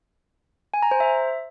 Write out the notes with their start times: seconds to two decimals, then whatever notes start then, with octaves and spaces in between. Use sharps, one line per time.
0.74 G#5
0.82 A#5
0.91 C5
1.00 E5